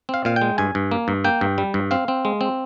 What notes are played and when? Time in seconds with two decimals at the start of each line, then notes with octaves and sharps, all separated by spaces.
0.09 C4 F5
0.25 A#2 F5
0.36 G5
0.42 G#3
0.58 G2 G#5
0.75 G2
0.92 A#3
1.08 G2
1.24 A#3 G5
1.41 G2
1.58 G3
1.74 G2
1.91 C4 F5
2.08 C4
2.25 G#3
2.41 C4